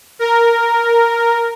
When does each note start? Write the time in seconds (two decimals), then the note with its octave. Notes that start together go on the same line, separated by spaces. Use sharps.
0.19 A#4